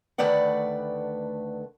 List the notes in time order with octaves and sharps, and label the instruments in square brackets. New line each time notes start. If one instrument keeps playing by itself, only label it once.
[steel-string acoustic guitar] D2 D#3 A3 B4 D5 F#5